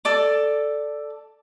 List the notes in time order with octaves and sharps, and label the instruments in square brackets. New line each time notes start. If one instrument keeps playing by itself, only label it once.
[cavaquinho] A4 D5 D6